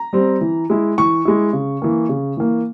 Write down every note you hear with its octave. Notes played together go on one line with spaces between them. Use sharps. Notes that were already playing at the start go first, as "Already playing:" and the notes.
Already playing: A#5
G3 C4
E3
G#3 E4
E3 C#6
G#3 E4
C#3
E3 A#3
C#3
E3 A#3